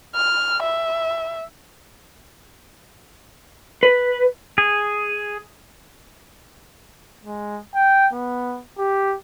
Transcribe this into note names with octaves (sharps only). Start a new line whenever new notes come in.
F6
E5
B4
G#4
G#3
G5
B3
G4